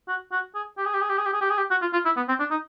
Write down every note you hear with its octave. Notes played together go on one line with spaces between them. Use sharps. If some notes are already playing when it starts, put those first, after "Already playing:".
F#4
F#4
G#4
G4
G#4
G4
G#4
G4
G#4
G4
G#4
G4
G#4
G4
F#4
F4
F4
E4
B3
C4
D4
D#4